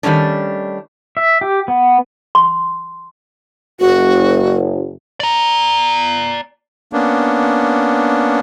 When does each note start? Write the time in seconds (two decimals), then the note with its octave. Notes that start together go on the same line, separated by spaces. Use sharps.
0.03 D#3 G3 A3 C#4 D4
1.17 E5
1.41 G4
1.68 B3
2.35 C6
3.80 F#1 F#4
5.20 D5 A#5
6.93 A#3 B3 C#4 D4